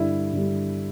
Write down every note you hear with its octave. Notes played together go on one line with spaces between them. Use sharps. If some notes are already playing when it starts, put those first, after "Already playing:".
Already playing: G2 D3 G3 E4
G2 D3 G3